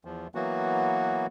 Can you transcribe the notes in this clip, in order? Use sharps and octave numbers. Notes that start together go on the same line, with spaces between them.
E2 F3
E3 F#3 A#3 B3 F#4